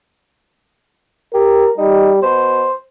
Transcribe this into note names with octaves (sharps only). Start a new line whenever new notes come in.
G4 A#4
G3 D#4
B2 C5